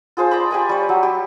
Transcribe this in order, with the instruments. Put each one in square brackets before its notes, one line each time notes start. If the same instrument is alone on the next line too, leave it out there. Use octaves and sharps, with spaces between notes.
[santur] F4 G#4 C5 A5
D5 A#5 B5
G4 G#5 A#5
G3 C#5
F#3
G4